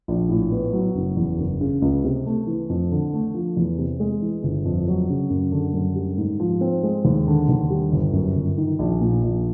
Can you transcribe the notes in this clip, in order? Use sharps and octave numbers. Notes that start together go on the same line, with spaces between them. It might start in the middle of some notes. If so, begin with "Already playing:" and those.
A#1
A2
B3
F#3
F#1
E2
F#1
C#3
C#2
C3
A3
E3
F2
D3
A3
F3
E2
C3
G#3
E3
G1
F2
F#3
C#3
F#2
D3
F#2
G3
G#2
F3
C4
G#3
D#2
D3
D#2
G3
G1
F#2
G1
D#3
A#1
A#2
A#1